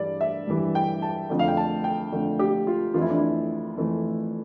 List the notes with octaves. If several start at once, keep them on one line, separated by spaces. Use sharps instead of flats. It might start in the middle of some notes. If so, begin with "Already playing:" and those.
Already playing: G2 E3 G3 D5
E5
G2 E3 G3
G5
A5
F2 D3 A3
F5
G5
A5
G5
F2 D3 A3
G4
F4
F2 E3 A3 F4
E4
D4
E4
F2 E3 A3